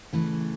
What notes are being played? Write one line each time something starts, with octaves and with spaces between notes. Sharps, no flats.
C#3 E3 A3 E4